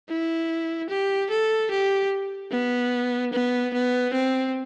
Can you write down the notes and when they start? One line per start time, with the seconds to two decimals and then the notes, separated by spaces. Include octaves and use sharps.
0.09 E4
0.89 G4
1.31 A4
1.71 G4
2.52 B3
3.33 B3
3.73 B3
4.14 C4